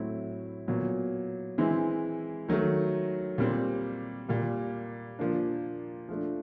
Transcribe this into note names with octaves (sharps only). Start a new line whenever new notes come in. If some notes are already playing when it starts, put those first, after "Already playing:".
Already playing: A2 F#3 A3 C4 E4
A#2 F#3 B3
E3 G#3 C4 E4
D#3 F#3 A3
A#2 G3 C4
A#2 G3 A#3
A#2 F3 A#3 D4
F3 A3 D4